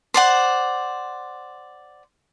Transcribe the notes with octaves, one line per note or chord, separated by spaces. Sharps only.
C5 D5 F#5